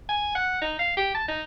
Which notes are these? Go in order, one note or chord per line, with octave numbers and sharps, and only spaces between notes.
G#5
F#5
D#4
F5
G4
A5
D#4